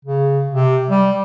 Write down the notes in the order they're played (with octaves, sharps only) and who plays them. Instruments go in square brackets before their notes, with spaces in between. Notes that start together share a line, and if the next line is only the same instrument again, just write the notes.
[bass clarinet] C#3
C3
G3